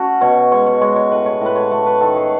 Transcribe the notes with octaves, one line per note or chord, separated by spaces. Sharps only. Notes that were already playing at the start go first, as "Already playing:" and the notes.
Already playing: A3 C#4 F#4
B2 C#5
G#3 C#5
C#5
G#3 C#5
C#5
A2 B4
C#5
A2 B4
C#5
A3 C#5
B4
D#3 A4
G#4